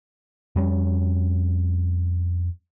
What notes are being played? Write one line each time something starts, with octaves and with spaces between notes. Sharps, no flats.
F2 G3 C#4